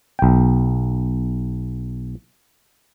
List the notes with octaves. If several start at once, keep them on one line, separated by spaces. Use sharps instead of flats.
B1 G5